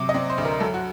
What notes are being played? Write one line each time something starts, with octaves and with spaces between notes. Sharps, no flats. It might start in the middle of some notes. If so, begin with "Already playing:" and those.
Already playing: C3 F#3 D6
D#5
C4 D5
C5
D2
A#4
F#3 A4
F#4